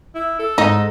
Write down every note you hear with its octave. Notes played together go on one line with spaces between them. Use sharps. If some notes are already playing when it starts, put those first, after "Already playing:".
E4
A4
G#2 D#4 D#5